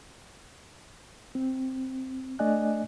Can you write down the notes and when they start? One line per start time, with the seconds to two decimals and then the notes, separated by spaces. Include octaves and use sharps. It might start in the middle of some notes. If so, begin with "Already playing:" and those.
1.35 C4
2.39 A3 D4 D5 D#5 G#5 F#6